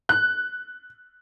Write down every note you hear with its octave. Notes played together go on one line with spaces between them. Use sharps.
F#6